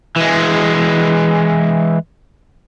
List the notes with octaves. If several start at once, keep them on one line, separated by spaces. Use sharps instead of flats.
E3 G#3